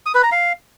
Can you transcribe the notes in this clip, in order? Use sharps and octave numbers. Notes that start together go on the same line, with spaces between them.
D#6
B4
A#5
F5